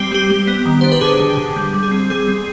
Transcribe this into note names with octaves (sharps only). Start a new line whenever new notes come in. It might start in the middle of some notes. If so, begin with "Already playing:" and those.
Already playing: G3 C4 G4
G3 G4
G3
B3
D#3
D4 C5
B4
D3 G#4
D3
G4
D3
G3
G3
G#4
C4
G3 G#4
C4